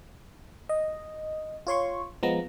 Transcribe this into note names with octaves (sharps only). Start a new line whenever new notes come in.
D#5
F4 C#5 C6 C#6
F3 G#3 B3 A#5